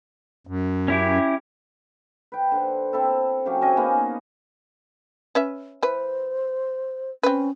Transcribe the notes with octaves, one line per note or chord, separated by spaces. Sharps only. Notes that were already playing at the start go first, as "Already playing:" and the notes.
F#2
C#4 E4 G4
B4 G5
D3 C5
C4 E4 A4
C#3 F#3 C#4 G4
C4 C#4 D#5 G#5
A#3 B3 D#4 G#4
C#4 B4 E5
E3 B4 C5
C4 C#4 B4